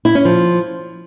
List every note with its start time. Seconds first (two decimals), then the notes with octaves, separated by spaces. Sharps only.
0.05 E4
0.15 C#4
0.25 F3